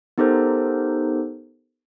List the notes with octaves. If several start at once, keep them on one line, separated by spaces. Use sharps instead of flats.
B3 D#4 G4 A4 A#4 C5